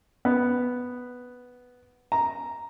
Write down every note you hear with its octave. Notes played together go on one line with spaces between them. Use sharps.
B3
A#5